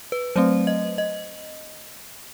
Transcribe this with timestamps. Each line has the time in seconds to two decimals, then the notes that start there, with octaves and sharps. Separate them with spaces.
0.12 B4
0.36 F#3 A3 C4 C5
0.67 D#5
0.98 D#5